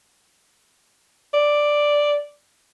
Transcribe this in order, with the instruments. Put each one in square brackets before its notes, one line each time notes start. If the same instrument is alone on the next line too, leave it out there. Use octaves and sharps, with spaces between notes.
[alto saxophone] D5